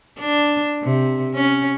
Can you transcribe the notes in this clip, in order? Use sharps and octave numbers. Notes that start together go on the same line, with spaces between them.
D4
C3
C#4